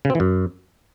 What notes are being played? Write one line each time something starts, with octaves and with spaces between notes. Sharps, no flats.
C#3
C4
E3
F#2